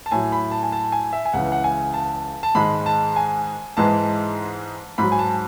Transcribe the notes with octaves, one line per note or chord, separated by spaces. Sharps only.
A5
A2 F#3 G#5
B5
A5
G#5
A5
G#5
E5
G#5
C#2 C#3 E3 F#5
F#5
G#5
A5
A5
G#2 D#3 G#3 B5
A5
G#5
G#2 E3 G#3 A5
G#2 F#3 B5
G#5
A5